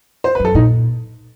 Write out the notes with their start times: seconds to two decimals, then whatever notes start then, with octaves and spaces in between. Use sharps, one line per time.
0.24 C5
0.35 B4
0.40 F#2
0.45 A4
0.55 A#2 D#4